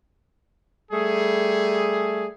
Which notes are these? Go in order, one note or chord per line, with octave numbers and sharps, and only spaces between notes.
G3 A3 G#4